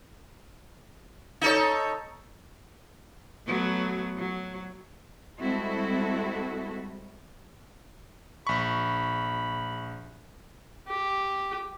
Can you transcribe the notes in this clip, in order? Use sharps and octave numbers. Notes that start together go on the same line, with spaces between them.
D#4 A4 C#5
F#3 A3 B3
F#3
G3 G#3 C4 E4 F#4 A4
A#1 B5 C#6
G4